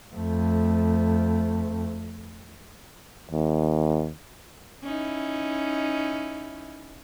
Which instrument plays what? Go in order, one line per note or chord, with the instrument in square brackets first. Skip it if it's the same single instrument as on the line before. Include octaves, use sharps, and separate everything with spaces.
[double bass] F2 A3
[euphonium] D#2
[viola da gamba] C#4 D#4 E4